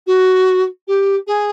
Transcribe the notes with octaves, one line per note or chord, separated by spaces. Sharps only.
F#4
G4
G#4